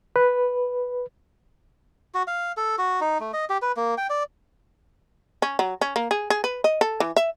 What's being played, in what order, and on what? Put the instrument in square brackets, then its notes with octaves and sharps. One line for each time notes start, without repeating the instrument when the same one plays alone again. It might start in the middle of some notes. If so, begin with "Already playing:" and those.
[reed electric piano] B4
[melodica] F#4
F5
A4
F#4
D#4
A3
D#5
G4
B4
A#3
G5
D5
[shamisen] C#4
F#3
C#4
A#3
G#4
G#4
B4
D#5
A4
E3
E5